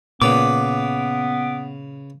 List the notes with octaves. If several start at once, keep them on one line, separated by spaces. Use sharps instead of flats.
A#2 C#3 B3 B4 D6